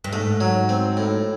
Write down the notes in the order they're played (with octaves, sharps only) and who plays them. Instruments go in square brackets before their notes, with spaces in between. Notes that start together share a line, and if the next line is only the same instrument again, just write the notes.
[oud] G2
[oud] G#2 [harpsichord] A3
[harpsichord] F#3
C4
A2